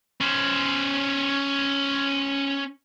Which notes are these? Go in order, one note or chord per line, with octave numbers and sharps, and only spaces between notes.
C#4 C5